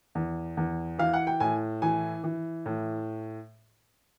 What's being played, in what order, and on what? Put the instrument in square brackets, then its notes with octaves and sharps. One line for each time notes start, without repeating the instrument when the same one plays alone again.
[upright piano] E2
E2
E3 F5
F#5
G5
A2 G#5
E3 G#5
E3
A2